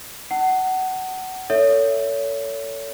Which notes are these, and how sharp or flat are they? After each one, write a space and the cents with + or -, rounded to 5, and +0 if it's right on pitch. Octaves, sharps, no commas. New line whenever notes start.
F#5 +20 A5 +30
A4 +30 C#5 +30 E5 +0